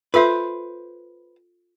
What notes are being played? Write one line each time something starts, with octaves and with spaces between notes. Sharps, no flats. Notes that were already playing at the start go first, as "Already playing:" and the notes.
F4 A4 B4 C5 E5